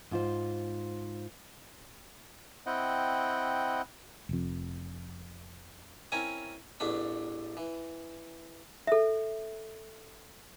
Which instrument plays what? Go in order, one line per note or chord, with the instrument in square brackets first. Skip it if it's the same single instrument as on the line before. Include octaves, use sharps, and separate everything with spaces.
[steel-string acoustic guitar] G#2 F4 C5
[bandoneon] C4 E4 D#5 F#5 G5
[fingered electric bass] F1 F2
[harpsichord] C4 C#4 E4 A#4 G#5
A1 E2 A3 D4 B5
E3
[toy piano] A4 E5